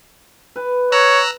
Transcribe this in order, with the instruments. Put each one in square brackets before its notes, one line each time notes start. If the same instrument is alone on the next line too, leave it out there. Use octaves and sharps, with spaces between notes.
[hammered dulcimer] B4
[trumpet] C#5 [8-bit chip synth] A#5 E6 F#6